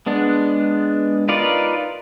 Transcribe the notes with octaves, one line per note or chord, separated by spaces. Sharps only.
G#3 B3 D4
D#4 F4 A#4 B4 D5